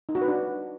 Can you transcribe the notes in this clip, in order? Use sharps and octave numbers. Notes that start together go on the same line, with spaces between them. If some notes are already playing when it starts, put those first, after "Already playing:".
D#4
F#4
B4
D4